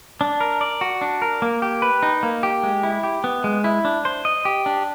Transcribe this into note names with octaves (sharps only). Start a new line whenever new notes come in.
D4
A#4
D5
F#4
D4
A#4
A#3
G4
B4
D#4
A#3
G4
G#3
E4
G4
B3
G#3
E4
D4
C5
D#5
G4
D4